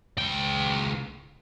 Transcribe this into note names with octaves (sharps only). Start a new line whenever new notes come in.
C#2 G5